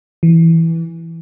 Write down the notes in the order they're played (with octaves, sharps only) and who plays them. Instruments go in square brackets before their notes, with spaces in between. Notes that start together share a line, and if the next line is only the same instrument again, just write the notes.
[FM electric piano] E3